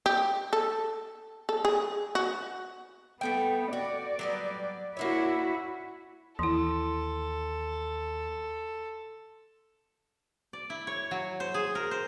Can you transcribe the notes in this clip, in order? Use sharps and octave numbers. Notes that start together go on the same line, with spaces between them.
G4
A4
A4
G#4
F#4
G3 A3 B3 G5
F#4 D5
F#3 G3 B3
A#3 D4 E4 F#4 C#5
D#2 E3 E4 A4 C6
D5
E4
C#5
F#3
C5
G#4
A#4
C5